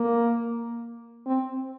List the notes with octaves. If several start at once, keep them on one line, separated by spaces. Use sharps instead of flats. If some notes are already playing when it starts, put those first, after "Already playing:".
Already playing: A#3
C4